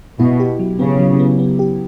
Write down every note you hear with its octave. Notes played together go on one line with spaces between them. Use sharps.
B2 E4
G4
F#3
C#3 B3
F#3
B3
B3
G4